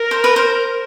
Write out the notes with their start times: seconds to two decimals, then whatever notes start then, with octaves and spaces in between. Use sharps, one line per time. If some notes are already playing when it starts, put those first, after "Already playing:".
Already playing: A#4
0.11 C5
0.24 B4
0.36 C5